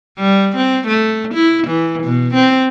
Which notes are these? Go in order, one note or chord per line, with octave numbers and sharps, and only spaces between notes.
G3
C4
A3
E4
E3
B2
C4